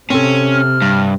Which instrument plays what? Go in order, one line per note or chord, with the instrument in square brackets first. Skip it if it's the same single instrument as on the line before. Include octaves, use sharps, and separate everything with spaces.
[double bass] C3 [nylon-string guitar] C4 A4 [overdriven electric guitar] C#4
[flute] F6
[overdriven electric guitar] G2